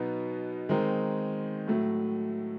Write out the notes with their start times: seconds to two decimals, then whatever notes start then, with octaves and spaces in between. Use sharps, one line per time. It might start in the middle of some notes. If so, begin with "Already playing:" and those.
Already playing: B2 F#3 B3 D#4
0.69 D#3 G#3 C4 D#4
1.68 A2 F#3 A3